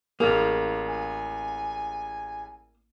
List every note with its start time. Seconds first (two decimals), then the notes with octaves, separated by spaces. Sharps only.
0.20 A1 A#3 G#4
0.88 G#5